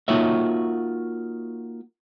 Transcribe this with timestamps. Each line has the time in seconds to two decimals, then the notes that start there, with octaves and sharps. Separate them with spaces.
0.08 A#3 D#4 F4 F#4 C#5 E5